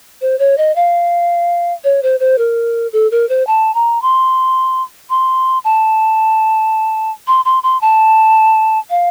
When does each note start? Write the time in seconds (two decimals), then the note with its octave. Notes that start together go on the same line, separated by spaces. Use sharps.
0.21 C5
0.39 C#5
0.58 D#5
0.76 F5
1.84 C#5
2.03 C5
2.20 C5
2.38 A#4
2.93 A4
3.11 A#4
3.29 C5
3.47 A5
3.75 A#5
4.02 C6
5.10 C6
5.64 A5
7.27 C6
7.45 C6
7.63 C6
7.81 A5
8.90 F5